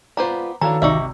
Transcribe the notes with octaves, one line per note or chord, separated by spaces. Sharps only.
B3 F4 G4 B4 C5 D5 A#5
D#3 E3 D4 F#4 A4 C#5 F5 A#5
G#1 C3 D#4 D5 E5 C#6 E6